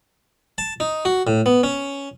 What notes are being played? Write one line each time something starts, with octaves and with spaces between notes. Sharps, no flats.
A5
D#4
F#4
A2
B3
C#4